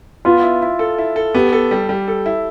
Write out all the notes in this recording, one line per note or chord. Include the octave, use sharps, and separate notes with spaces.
B3 F4
E4
E4
A4
E4
A4
B3 G4
A4
G3
G3
A4
E4